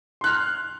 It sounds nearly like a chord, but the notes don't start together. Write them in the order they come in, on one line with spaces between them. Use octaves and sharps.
C6 F#6 F6